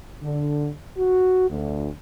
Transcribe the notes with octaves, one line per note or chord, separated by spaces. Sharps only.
D3
F#4
D2